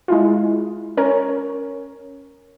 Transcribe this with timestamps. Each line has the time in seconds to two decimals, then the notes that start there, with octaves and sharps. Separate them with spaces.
0.08 G#3 E4 F4
0.97 C#4 A#4 C#5